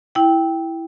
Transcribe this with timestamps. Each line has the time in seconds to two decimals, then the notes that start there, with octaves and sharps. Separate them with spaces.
0.15 E4 G5